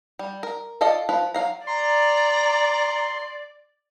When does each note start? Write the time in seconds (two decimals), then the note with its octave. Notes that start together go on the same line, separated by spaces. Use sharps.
0.19 G3
0.43 A#4
0.81 F4 A4 D5 D#5 F5
1.09 F3 F4 B4
1.34 F#3 F5 A#5
1.67 D5 A#5 C6